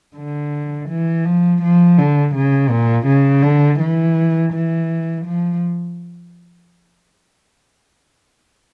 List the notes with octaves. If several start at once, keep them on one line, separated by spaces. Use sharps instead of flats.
D3
E3
F3
F3
D3
C#3
A#2
C#3
D3
E3
E3
F3